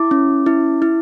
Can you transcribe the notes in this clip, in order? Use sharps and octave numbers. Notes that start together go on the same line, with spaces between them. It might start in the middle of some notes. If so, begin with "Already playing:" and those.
Already playing: E4 D6
C#4
E4
E4